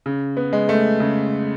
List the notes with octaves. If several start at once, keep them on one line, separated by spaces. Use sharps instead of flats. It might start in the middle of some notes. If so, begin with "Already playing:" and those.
C#3
B3
G#3
A3
C#3